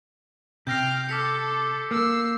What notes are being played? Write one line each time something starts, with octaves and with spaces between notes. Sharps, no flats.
C3 G5 F6 G6 A#6 C7
A4 D6 B6 C#7
A#3 E6 C7